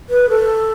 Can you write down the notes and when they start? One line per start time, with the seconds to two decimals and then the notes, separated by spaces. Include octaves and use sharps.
0.10 B4
0.30 A4